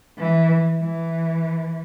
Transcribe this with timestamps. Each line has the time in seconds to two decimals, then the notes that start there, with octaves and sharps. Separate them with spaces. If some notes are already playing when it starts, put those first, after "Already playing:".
0.19 E3
0.78 E3